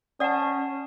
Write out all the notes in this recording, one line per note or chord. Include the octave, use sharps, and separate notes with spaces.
C#4 D5 F#5 A5 D#6